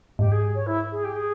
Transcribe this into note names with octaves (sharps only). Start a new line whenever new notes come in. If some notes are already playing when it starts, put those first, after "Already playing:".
G#2 G4
G#4
C#5
E4
G#4
G4
G#4